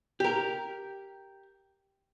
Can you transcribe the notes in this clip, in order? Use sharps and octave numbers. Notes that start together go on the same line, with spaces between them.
G4 A#4